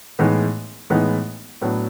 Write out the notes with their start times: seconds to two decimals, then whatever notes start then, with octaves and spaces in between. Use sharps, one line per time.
0.19 A2 E3 G#3 B3 D#4
0.90 A2 E3 G#3 B3 D#4
1.61 A2 F#3 B3 D4